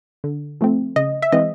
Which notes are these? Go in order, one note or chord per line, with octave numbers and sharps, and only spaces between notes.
D3
F3 A3 C4
C#3 D#5
E5
E3 G#3 C4 D#5